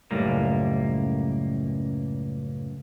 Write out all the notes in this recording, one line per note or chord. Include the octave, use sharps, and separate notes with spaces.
C#2 F#2 A2 G3 A#3